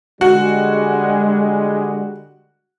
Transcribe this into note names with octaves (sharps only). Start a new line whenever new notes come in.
D3 G3 G#3 F#4